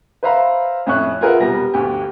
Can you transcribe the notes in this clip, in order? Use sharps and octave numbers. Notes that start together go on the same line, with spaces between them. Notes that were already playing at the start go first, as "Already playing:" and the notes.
B4 C5 E5 F5 A#5 B5
F2 A2 C#4 E5 C#6 F#6
F4 G#4 A#4 B4 E5 F#5
E1 C3 G3 B3 A#6
G1 D2 G4